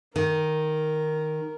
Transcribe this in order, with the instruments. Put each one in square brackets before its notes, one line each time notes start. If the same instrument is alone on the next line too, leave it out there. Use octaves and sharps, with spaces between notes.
[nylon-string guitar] D#3 [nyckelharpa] A#4